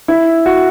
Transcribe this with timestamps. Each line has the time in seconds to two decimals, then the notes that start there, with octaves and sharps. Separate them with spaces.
0.08 E4
0.46 F#4